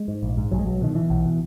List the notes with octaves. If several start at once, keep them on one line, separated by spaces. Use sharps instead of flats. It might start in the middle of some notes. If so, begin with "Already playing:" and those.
Already playing: G#3
G#2
A#1
G#2
B1 F#3
G#3
B1 F#3
B2 D#3
B2 E3
B1
B2